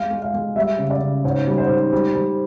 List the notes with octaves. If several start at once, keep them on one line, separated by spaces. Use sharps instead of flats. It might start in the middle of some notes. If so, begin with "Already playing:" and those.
Already playing: G#3 F5
G#3
F5
G#3
G3 E5
C#3
D5
C#3
G#2 C#5
G3
C5
G#2
G3
G3